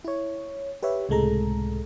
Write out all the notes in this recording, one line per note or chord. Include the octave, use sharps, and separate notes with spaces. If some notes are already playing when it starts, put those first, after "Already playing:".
E4 C#5
G4 B4 C#5 E5
C#2 A2 C3 G#3 A4 A#5